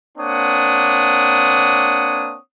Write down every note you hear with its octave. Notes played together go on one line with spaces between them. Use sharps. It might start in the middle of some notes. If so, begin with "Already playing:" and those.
A#3 C4 D4 C#5 F#5 D#6